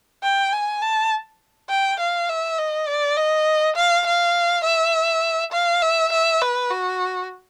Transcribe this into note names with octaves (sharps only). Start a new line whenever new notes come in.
G5
G#5
A5
G5
F5
E5
D#5
D5
D#5
F5
F5
E5
F5
E5
E5
B4
F#4